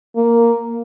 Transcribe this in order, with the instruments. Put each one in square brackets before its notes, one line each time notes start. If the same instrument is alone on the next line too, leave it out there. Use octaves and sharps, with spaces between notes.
[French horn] A#3